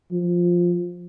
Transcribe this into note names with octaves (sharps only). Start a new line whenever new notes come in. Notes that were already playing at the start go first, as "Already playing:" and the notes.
F3